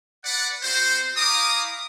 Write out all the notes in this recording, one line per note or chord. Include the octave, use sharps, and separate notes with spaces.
B4 D5 F#5
C4 F#4 C5
E4 F5 A#5 D6 D#6